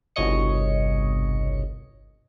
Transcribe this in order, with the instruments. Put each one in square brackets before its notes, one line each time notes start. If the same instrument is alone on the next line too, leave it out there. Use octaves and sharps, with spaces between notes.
[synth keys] G1 C2 B2 C#5 D#5 C#7